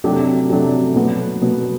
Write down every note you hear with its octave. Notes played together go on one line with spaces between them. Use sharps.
C3 F#3 A3 D4 G4
C3 F#3 A3 D4 G4
B2 F#3 B3 F#4
B2 F#3 B3 F#4